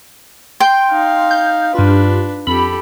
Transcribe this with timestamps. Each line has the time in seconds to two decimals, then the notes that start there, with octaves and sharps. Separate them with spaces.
0.60 G5 C6
0.90 D#4 F5
1.31 G6
1.75 G2 D4 F4 B4
2.47 F2 G4 A4 B5